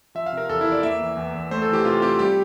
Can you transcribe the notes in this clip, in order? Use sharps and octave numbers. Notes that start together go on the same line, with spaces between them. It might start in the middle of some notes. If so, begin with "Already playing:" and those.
F3 E5
F5
C3 A#4
E2 A4
E4
E2
D5
A#3 E5
E3
E2
E2
A3 C5
A4
E3 G4
C3 F4
C4 G4
G3 G4